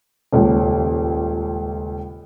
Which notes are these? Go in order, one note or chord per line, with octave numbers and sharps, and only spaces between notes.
D#1 C#2